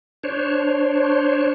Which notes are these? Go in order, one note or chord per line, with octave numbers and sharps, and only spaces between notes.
D4 C5 C#5